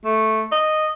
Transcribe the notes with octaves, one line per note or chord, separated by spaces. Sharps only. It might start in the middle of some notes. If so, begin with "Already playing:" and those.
A3
D#5